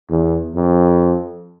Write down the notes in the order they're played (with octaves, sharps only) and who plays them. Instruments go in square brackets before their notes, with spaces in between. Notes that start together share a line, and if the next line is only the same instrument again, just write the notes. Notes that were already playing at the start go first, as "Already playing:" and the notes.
[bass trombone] E2
F2